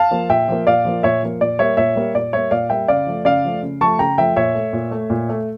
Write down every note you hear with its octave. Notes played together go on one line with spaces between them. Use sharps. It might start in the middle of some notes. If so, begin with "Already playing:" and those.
Already playing: F5 A5
F3 A#3
A#2 E5 G5
F3 A#3
A#2 D5 F5
F3 A#3
A#2 C#5 E5
F3 A#3
A#2 D5
G3 A#3 C#5 E5
A#2 C#5 E5
G3 A#3
A#2 D5
G3 A#3 C#5 E5
A#2 D5 F5
G3 A#3 E5 G5
C#3 D5 F5
F3 A3
C#3 D5 F5
F3 A3
C#3
F3 A3 A5 C#6
C#3 G5 A#5
F3 A3 E5 G5
A#2 C#5 E5
A3
A#2
A3
A#2
A3